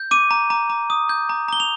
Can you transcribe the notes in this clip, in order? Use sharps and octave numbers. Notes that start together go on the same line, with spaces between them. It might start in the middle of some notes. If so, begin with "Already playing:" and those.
Already playing: G6
D6 D#7
A#5
A#5
A#5
D#6
G6
A#5
A#5 G7
F7